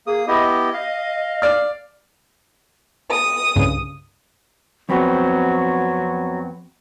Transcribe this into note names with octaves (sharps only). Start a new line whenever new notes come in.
A#3 G#4 D#6
B3 E4 G4 D#5
F5
D5 F6
D#6
C2 G2 C#3
F2 F#3 B3 C4